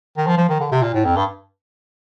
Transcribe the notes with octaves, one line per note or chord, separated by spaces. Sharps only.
D#3
F3
F3
D#3
D3
C3
A#2
A2
F2
G2